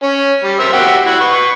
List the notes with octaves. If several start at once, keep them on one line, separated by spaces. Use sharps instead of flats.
C#4
G3
A#4 C5 E5
F#4 G4 E5
E4 F#4
B4 C#6